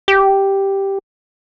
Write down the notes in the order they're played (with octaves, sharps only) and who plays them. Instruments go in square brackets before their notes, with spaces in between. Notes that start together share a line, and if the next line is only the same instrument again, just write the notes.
[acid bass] G4